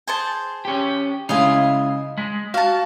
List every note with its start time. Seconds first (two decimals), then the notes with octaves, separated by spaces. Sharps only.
0.08 G#4 C5 A5
0.65 C#4 G4
1.29 C#3 G#3 E4 D#5 F5 G#5
2.18 G#3 B6
2.54 F#4 F5 A5